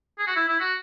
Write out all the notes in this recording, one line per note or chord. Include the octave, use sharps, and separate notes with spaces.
G#4
F#4
E4
E4
F#4